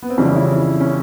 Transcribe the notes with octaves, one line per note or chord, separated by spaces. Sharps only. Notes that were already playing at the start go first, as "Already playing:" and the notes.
B3
C4
F2 C#3 E3 G3 C#4
E4
C#4